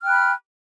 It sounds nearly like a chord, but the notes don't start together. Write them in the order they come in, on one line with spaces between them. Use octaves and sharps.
F6 G5 F#6 B5